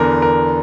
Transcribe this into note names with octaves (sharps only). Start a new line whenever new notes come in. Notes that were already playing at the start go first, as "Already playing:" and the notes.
Already playing: E2 D3 A#4
A#4